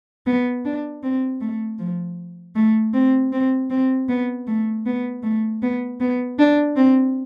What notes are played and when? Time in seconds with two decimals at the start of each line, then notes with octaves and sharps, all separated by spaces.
0.26 B3
0.65 D4
1.03 C4
1.41 A3
1.79 F3
2.55 A3
2.94 C4
3.33 C4
3.70 C4
4.09 B3
4.47 A3
4.86 B3
5.23 A3
5.63 B3
6.00 B3
6.39 D4
6.76 C4